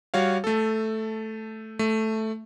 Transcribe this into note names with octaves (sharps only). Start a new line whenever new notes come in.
G3 F#4 C#5 F5
A3 A4
A3